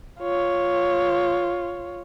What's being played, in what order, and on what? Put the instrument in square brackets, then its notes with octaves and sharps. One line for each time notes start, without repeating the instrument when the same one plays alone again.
[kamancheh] F4 C#5